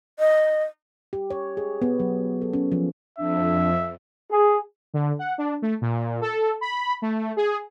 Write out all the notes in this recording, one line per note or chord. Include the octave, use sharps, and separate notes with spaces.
D#5
G4
C#5
G#4
B3
F#3
A4
C#4
F3
F2 D4 E5
G#4
D3
F#5
D4
A3
A#2
A4
B5
A3
G#4